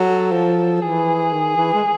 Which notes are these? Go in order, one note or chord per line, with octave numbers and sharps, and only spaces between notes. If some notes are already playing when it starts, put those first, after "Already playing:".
Already playing: F#3 A4
F3
E3 G#4
D#3
E3
G#3